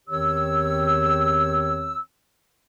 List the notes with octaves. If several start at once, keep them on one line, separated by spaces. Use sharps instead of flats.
E2 D#3 C4 G4 C#5 E6